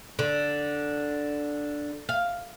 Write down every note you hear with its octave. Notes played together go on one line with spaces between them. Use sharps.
D3
F5